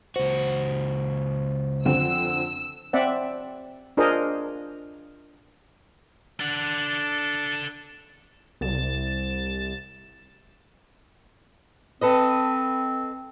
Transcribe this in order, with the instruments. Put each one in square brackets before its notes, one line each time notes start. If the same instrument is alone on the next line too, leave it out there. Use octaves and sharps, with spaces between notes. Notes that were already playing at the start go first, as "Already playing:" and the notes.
[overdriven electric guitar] C#2 F#4 [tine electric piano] C5
[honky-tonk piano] F2 D3 C4 [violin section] E6
[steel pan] C4 D5 E5 F#5
D4 F4 G#4 A#4 C5 D#5
[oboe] D4 [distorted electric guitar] A4 F#5
[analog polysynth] C2 A6 E7
[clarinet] C4 [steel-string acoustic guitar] A4 B4 D#5